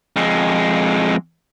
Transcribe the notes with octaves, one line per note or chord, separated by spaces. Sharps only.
F2 G#3